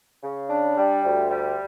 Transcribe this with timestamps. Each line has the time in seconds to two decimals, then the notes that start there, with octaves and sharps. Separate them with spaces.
0.23 C#3
0.50 D4
0.77 G3
1.04 D2
1.30 G3